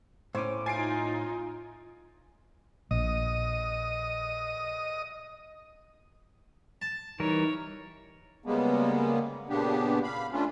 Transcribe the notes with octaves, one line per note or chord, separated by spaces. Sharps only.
A2 C#4 C5 D6
D#4 F4 G#5 A6 C7 D7
A#1 D#5
A5
E3 G3 D#4 A#4 C#5
C#3 G3 G#3 A#3 B3
A#2 C#3 B3 D4 G4
F5 B5
A3 C#4 D4 F4